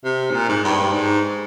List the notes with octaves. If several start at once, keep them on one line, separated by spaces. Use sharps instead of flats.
C3
G#2
A#2
G#2
G2
G#2